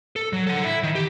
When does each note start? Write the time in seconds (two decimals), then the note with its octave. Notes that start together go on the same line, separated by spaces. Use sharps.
0.16 A4
0.33 F#3
0.47 A4 F#5
0.64 E4
0.83 D#3
0.95 G4